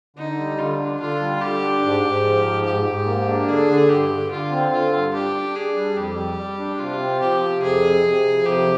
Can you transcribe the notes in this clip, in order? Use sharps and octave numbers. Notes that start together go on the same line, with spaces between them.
D3 D#4
G3
D3 F4
D4
D3 F4
G3
D3 G4
D4
G#2
G#2
F3
G#2
G#2 G4
G#2
A#3
D4
D3 G#4
D3
G2 G4
D3
D3 F4
C4
D3 F4
G2
D4 G4
D4
D4 G#4
G3
F2 G4
G3
G3
D4
C3 F4
C4
F3 G4
C3
F2 G#4
C3
C3
F2
C3 G4